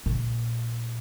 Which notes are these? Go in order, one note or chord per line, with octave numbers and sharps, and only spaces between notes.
A#1 A#2